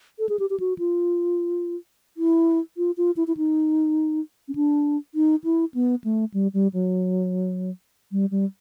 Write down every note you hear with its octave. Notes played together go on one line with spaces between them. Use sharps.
A4
G#4
G4
G4
F#4
F4
E4
F4
F4
E4
E4
D#4
C#4
D4
D#4
E4
B3
A3
G3
G3
F#3
G3
G3